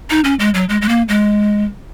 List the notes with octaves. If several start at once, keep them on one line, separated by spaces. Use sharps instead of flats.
D#4
C#4
G#3
F#3
G#3
G#3
A#3
G#3